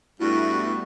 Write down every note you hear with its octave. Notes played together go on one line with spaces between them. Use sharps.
G2 G3 A3 B3 E4 F#4